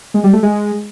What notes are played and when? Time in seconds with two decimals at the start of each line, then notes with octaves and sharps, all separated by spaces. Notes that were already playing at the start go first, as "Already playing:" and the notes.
0.14 G#3
0.24 G3
0.33 A3
0.43 G#3